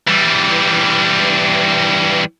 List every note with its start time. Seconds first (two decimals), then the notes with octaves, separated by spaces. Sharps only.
0.08 E3 G3